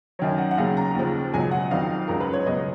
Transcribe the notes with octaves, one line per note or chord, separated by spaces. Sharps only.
F#2 D#3 F#3 C#5
F#5
F#5
D#2 C#3 F#3 F5
A#5
D#2 C#3 F3
C#2 B2 F#3 G#5
F#5
F2 D#3 F#3 F5
C#2 C#3 F#3 A#4
B4
C#5
C#2 B2 F#3 D#5